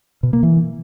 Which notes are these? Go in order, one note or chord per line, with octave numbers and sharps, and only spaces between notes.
B2
A#3
E3